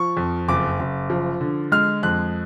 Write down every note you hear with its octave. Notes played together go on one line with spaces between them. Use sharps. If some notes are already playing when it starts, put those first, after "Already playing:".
Already playing: F3 C#6
F2
F#1 D6
F#1
F3
D3
G#3 F6
F2 F#6